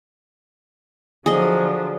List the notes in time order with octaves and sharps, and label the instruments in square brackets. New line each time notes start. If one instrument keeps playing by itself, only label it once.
[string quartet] D3 F3 F#3 [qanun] G#4 D#5